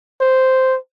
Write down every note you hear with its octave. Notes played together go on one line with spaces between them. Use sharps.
C5